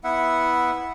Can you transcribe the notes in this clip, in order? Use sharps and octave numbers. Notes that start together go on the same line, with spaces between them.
B3 E4 E5 F#5